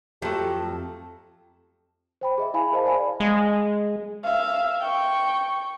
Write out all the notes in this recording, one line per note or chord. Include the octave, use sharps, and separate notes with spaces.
F2 F#3 A3 G4 A5
C5 G5 B5
G#4 D#5 E5
E4 F5 G#5 B5
G#4 A#4 C5 D#5 F5 A5
C5 D5 F5 G#5 B5
G#3
E5 F5
G5 C#6